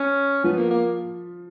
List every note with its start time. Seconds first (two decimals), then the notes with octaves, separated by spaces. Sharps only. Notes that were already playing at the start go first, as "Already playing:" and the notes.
Already playing: C#4
0.44 F3 B3 F4
0.57 A#3
0.70 A#3